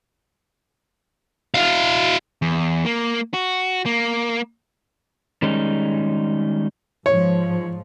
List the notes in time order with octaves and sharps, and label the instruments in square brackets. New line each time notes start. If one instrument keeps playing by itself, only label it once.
[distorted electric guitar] E4 F5
[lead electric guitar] E2
A#3
F#4
A#3
[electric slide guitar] D#3 G3 G#3 C#4 D#4
[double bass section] G#2 F3 [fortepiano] C#5